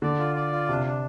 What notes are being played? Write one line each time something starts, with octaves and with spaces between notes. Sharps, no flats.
D3 D5
F4
D5
F4
C3 D4
D4